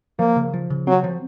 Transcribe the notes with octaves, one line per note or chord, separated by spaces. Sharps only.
F3 A#3
C#3
F3
C#3
F#3 C4
F3